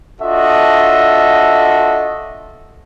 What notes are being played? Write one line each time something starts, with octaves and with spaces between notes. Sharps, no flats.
D4 F4 F#4 A4 D#5 E5